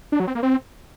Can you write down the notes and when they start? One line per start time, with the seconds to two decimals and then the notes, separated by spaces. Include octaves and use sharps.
0.12 D4
0.20 F#3
0.27 C4
0.35 A#3
0.43 C4